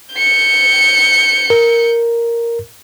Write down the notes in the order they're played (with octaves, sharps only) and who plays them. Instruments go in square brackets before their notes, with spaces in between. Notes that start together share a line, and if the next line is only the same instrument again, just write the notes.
[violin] G6 C#7
[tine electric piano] A#4